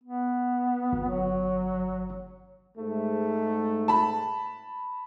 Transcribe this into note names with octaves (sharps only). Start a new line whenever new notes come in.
B3
G1
F#3
G#2 A3
A5 B5